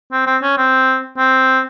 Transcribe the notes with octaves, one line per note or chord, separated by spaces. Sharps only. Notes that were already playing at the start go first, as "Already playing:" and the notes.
C4
C4
C#4
C4
C4